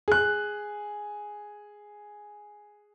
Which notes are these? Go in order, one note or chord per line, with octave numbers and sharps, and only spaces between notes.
G#4 F#6